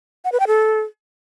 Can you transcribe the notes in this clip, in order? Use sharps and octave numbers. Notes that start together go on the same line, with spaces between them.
F#5
B4
G5
A4